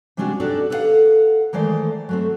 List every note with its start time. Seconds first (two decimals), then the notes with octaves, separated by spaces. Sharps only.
0.17 C3 G3 G#3 C#4 D4 F#4
0.40 D4 D#4 F#4 G4 A4 D5
0.70 A4 B4 C5 F5 F#5
1.53 D#3 E3 G#3 A3 C5 D5
2.09 F#3 A3 C4